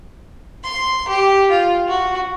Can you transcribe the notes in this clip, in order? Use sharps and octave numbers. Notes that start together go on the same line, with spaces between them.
C6
G4
F4
F#4